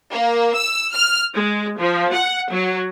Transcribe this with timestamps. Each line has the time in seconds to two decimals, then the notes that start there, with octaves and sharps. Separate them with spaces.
0.11 A#3
0.57 E6
0.94 F6
1.34 G#3
1.80 F3
2.14 F#5
2.51 F#3